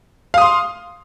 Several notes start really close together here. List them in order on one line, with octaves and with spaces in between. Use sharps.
F5 D#6 C6